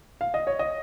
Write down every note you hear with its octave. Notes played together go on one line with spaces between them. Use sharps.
F5
D#5
C#5
D#5